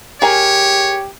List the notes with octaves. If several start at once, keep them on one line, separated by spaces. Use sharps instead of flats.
G4 G#4 A#4 C#5 G#5